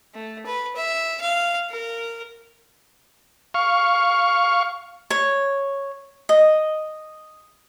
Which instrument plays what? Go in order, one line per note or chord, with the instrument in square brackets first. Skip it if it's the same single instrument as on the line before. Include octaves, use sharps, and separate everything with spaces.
[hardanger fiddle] A3
B4
E5
F5
A#4
[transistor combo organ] F5 C#6
[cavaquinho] C#5
D#5